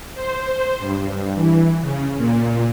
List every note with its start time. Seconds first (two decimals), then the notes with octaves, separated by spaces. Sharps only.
0.15 C5
0.79 G2
1.35 E3
1.82 C#3
2.17 A#2